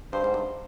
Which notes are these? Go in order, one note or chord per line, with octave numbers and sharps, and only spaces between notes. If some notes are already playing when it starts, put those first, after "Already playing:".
G2 C5
G#2
G2